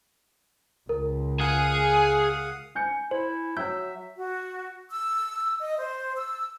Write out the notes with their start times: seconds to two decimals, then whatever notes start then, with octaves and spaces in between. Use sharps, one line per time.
0.89 C#2 A#4
1.40 G#4 F5 F#5 D#6
2.75 G#5 G6 C#7
3.11 E4 C5
3.57 F#3 E5 G5 E6 G6
4.17 F#4
4.91 E6
5.61 D#5
5.78 C5
6.16 E6